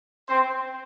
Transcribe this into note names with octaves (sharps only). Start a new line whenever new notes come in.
C4 C5